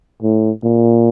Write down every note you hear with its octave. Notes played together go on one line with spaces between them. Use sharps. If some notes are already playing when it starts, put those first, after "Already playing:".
A2
A#2